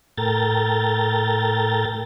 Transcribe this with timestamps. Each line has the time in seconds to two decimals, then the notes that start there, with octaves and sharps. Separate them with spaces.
0.17 A2 A4 A#4 G5 A#5 A6